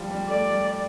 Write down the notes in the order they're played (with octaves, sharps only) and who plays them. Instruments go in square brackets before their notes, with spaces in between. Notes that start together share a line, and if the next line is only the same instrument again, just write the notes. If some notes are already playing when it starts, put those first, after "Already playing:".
Already playing: [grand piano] F3 G3
G3
[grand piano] A3 [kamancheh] D5
[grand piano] G3